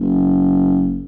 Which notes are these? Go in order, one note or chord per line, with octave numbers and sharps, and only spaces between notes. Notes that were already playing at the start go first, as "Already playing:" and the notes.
F#1